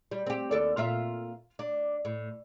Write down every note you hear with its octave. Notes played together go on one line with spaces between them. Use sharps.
G3
C4 G4
D#2 A4 D5
A#2 F4 E5
D4
A2